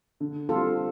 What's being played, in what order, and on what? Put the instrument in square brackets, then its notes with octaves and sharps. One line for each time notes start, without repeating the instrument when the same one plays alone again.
[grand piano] D3
[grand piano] G3 C4 [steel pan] F4 A4